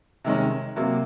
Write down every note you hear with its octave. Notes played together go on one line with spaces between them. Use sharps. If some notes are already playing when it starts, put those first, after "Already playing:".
C3 D#3 G#3 C#4
C3 F#3 A#3